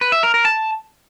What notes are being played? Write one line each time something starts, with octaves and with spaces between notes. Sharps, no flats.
B4
E5
A#4
A#4
A5